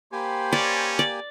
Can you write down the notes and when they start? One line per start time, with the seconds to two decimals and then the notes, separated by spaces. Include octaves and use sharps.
0.12 A#3 G4 C5 G5 G#5 B5
0.53 C#4 D5
0.99 D5